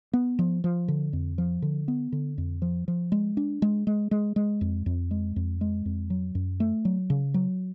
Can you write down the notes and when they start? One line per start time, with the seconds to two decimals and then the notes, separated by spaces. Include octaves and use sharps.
0.13 B3
0.39 F3
0.64 F3
0.88 D3
1.13 F2
1.38 F3
1.62 D3
1.88 B3
2.12 D3
2.38 F2
2.62 F3
2.88 F3
3.12 G#3
3.37 D4
3.62 G#3
3.87 G#3
4.11 G#3
4.36 G#3
4.61 F2
4.86 F2
5.11 G#3
5.36 F2
5.61 G#3
5.86 F2
6.10 F#3
6.35 F#2
6.60 A3
6.85 F#3
7.10 C#3
7.34 F#3